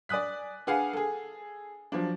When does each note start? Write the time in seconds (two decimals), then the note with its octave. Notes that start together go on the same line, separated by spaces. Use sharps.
0.09 D5 G#5 D#6 F#6 B6
0.67 D4 G#4 B4 F5 F#5 G#5
0.93 G#4 A4
1.92 F3 F#3 D4